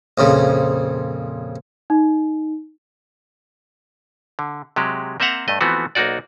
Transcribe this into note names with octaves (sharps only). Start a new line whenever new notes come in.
A#1 F2 C#3
D#4
D3
C3 F#3 G#3 G4
A#3 C4 C5 E5 F#5 A#5
G2 A3 D#5
E3 F3 A3 B3 C4 F#4
B1 A#3 D#4 F#4 D5